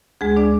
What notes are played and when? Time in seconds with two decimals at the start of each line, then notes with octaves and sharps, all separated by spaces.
0.21 D2 G#3 G#4
0.36 D4 D5